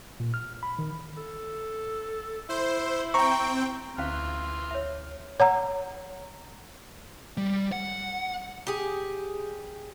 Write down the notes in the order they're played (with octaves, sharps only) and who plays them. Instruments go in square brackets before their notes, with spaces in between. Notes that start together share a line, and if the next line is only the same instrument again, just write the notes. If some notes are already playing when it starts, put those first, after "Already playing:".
[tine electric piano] A#2
F6
B5
D#3
[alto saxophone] A4
[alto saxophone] E4 [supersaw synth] C5
[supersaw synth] C4 G5 [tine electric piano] A#5 C#6
[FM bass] D2 [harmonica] E3 C6 F6 [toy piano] C#4 F5
[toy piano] C#5 E5
[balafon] C#5 F#5 A#5
[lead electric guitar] G3
F#5
[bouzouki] G4 G#4